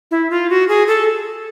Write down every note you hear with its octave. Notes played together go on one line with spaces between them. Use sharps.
E4
F4
F#4
G#4
A4